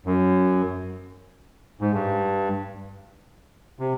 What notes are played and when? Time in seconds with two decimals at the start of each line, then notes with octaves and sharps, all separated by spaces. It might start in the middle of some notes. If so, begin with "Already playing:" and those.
0.06 F#2
1.81 G#2
1.93 G2
3.79 C3